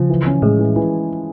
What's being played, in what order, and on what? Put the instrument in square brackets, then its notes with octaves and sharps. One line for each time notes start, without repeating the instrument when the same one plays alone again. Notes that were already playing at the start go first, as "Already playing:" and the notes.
Already playing: [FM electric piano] C#3 [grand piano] F3
[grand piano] E3
C#4
[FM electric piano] A2 [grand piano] G#3
[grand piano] E3
E3